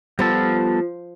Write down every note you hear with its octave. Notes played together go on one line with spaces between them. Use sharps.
F3 G3 B3 A4